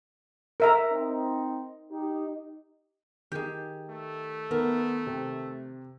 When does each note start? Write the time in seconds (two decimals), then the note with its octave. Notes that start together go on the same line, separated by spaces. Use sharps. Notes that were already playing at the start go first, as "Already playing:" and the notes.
0.60 A#4 E5 A#5
0.90 C4 D#4
1.90 D#4 G4
3.32 D#3 D#4 G4 G#4
3.89 A3
4.51 D#3 B3 A#4
5.07 C3